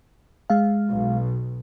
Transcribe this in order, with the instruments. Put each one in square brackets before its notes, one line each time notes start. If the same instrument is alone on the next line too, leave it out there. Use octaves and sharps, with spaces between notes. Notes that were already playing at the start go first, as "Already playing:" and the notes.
[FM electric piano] G#3 F5
[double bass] B1 B2